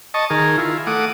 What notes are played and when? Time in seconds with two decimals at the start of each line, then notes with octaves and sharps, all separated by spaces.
0.14 D#5 A5 C#6
0.30 D#3 G#4 A#4
0.58 E4 F4
0.87 A3 F#5 D6 D#6